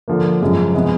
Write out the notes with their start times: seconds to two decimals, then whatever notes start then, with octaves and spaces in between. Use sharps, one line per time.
0.08 D3 F3 A#3
0.41 F#2 C#3 F3 G#3
0.74 C3 F3 G#3 B3 E4